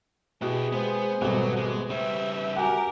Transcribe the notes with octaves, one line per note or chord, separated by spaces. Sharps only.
B2 E4 G4 G#4
G#3 B3 C5
G#1 B2 F#3 G3 A3 B3
G#3
C#3 G3 B4 C5 E5
F#4 G4 A#4 F#5 G#5